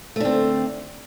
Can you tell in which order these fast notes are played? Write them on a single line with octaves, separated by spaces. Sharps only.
A3 D3 C4